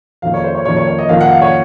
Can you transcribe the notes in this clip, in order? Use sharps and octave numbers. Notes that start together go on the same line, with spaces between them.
F2 D#3 A#3 F5
C#5
C5
C#5
F2 D#3 A#3 C#5
C#5
C#5
D#5
F2 D#3 A#3 F5
F#5
F5
C#5